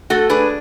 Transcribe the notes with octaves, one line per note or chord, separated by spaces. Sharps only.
A3 F#4 A4
D4 G#4 B4